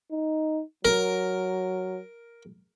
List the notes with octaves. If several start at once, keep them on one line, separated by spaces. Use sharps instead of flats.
D#4
F#3 A#4